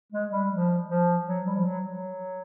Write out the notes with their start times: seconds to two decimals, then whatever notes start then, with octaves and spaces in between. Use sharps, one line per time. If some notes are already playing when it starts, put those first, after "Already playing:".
0.12 G#3
0.31 G3
0.51 F3
0.89 F3
1.27 F#3
1.46 G3
1.57 F3
1.66 F#3
1.85 F#3